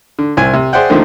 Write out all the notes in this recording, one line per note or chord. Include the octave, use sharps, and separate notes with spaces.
D3
C2 C4 E4 G#5
C3
G#4 C5 D5 E5 F#5 G5
D3 D#3 F3 A3 A#3 C4